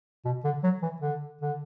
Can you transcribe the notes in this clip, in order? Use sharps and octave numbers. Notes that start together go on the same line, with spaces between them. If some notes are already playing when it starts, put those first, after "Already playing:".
B2
D3
F#3
E3
D3
D3